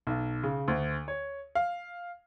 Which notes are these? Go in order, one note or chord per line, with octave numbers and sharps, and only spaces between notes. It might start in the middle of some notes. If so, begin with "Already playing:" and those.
B1
C#3
D2
C#5
F5